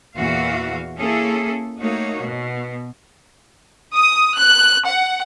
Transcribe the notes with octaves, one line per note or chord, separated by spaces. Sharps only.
E2 A#2 E3 F#4 F5
A#3 C#4 E4 G#4 A4
A3 A#3 D#4 F#4 C#5
B2
D#6
F#6
F#5